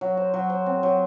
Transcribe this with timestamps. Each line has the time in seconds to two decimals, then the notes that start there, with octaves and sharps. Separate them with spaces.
0.01 F#3
0.17 C5
0.34 F#3
0.50 C5
0.66 C4
0.83 F#3